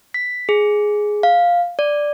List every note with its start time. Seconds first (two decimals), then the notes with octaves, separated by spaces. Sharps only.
0.14 B6
0.49 G#4
1.23 F5
1.79 D5